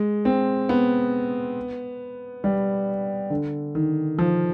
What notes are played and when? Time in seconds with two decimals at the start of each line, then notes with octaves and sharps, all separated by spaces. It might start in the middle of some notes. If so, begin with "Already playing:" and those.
Already playing: G#3
0.25 C4
0.69 B3
2.44 G3
3.30 D3
3.75 D#3
4.19 F3